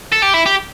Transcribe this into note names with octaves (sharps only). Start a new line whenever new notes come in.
A4
G4
E4
G4